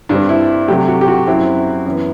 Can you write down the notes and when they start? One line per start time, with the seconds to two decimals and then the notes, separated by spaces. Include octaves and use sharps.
0.09 G2 D3 G3 C4 D4
0.29 E4
0.68 C3 F#3 A3 G4
0.88 F#4
1.01 G4
1.08 F#4
1.27 F#2 F#3 C4 E4
1.86 F#2 E3 B3